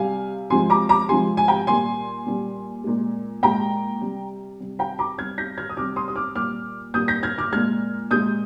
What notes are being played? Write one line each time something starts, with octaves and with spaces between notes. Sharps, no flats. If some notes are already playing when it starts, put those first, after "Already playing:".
Already playing: C3 G3 F5 G#5
C3 F3 G#3 G#5 C6
A#5 D6
A#5 D6
C3 F3 G#3 G#5 C6
G#5
G5 A#5
A#2 G3 G#5 C6
A#2 G3
A#2 G#3
A#2 G#3 G5 A#5
C3 G3
C3 G3
G5 A#5
A#5 D6
C3 G3 F6 G#6
G6 A#6
F6 G#6
D#6
C3 G3 D6 F6
C6 D#6
D#6
D6 F6
A#2 G3 D6 F6
A#2 G3 D#6 G6
G6 A#6
F6 G#6
D6 F6
A#2 G#3 F6 G#6
A#2 G#3 D#6 G6